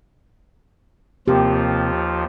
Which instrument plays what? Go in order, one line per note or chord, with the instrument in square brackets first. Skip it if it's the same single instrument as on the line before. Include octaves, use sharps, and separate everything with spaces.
[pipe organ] D#2 F3 F4 [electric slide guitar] C3 A#3 [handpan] G4